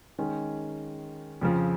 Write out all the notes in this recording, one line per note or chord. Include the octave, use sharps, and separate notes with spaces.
D#3 G#3 C#4
F2 C#3 F3